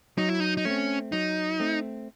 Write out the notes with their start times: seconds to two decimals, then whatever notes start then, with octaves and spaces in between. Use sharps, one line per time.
0.18 F#3 D#4
0.29 E4
0.40 D#4
0.57 D#4
0.65 A3 C4 C#4
1.12 F#3 D#4
1.60 A3 C4